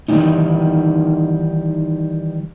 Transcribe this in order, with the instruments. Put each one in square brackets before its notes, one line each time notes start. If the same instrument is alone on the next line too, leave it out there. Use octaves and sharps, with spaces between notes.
[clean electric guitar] D#3 E3 G3 G#3 C#4 D#4